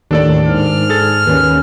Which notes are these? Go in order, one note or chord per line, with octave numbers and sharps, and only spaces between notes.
D#2 A2 D#3 D4 A4 D5
G#2 F6
G#4 A4 A6
D#2 D#3 C#4 B4